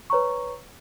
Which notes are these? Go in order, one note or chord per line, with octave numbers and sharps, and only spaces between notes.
B4 C#5 A#5 C#6